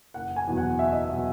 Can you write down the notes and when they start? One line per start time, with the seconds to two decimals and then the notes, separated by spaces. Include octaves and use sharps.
0.14 F#1 F#5
0.36 G#5
0.47 E2 B2 F#3
0.57 F#5
0.79 F#1 E5
0.92 D#5
1.05 E5
1.12 B2 F#3